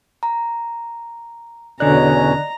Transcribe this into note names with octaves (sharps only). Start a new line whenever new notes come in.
A#5
E2 B2 D3 C#4 D5 D#5 A#5 F#6